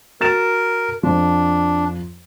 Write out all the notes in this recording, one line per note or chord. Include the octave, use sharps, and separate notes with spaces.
F#4 A#4 A6 E7
F2 F3 D4